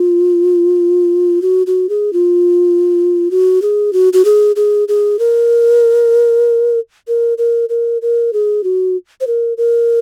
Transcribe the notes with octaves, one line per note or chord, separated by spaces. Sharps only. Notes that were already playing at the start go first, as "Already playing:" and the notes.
Already playing: F4
F#4
F#4
G#4
F4
F#4
G#4
F#4
F#4
G#4
G#4
G#4
A#4
A#4
A#4
A#4
A#4
G#4
F#4
C5
A#4
A#4